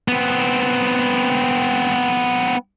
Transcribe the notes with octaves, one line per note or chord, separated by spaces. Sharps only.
B3 C4